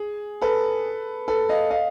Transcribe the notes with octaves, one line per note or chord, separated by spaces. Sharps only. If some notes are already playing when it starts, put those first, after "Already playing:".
Already playing: G#4
A4 B4
A4 B4
D#5 F5
D#5 F5